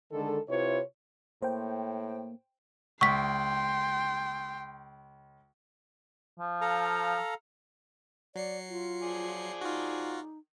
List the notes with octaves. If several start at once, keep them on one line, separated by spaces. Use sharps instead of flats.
D3 D#3 G#3 A4
C3 E4 F4 B4 C#5
A2 A#3 C5 G5
C#2 G5 C6 C#6 B6
F3
A4 F5 A#5
F#3 D5 C7 C#7
F4
F3 G#4 D5
D#4 F4 F#4